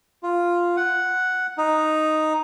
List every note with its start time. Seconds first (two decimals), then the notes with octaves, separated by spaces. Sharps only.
0.23 F4
0.77 F#5
1.58 D#4